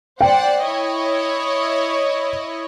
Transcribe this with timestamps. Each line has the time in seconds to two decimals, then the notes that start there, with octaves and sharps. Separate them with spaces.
0.21 C5 D5 F#5 G5
0.66 E4 C#5 D#5